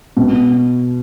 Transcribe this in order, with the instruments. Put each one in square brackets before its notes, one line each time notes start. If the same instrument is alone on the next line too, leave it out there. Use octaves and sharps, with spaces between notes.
[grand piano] B2